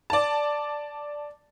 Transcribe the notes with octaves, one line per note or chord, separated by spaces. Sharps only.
D5 A5